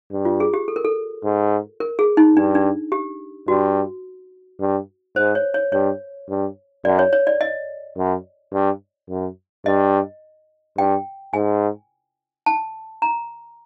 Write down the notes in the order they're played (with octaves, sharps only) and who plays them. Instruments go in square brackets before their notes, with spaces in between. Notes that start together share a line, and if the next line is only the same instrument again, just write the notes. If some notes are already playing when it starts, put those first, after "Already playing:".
[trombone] G2
[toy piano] F4
G#4
G4
A4
A#4
A4
[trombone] G#2
[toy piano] A#4
G#4
D#4
[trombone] G2 [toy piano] D4
[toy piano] D4
G4
[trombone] G2 [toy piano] F#4
[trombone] G2
[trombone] G#2 [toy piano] C5
[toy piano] C#5
C#5
[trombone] G2 [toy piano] C#5
[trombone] G2
[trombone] F#2 [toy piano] D5
[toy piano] C#5
C#5
D5
D#5
[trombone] F#2
G2
F#2
[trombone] G2 [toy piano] D#5
[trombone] G2 [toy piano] G5
[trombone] G#2 [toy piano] G#5
[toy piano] A5
A#5